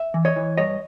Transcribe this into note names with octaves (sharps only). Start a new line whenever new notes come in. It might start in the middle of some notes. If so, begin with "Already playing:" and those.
Already playing: E5
E3
C#5 D#5
E3
G2 C#5 D#5